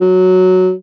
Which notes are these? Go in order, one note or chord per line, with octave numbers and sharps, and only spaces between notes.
F#3